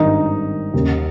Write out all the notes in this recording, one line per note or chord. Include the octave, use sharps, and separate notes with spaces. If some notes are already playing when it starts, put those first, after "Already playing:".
Already playing: G#1 G2 D#3 D#4
D#2 C#3